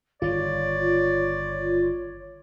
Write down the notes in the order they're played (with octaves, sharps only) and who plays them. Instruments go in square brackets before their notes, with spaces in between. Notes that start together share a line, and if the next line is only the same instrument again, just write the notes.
[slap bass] G1 D#3 [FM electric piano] F4 [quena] C#5 [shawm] D5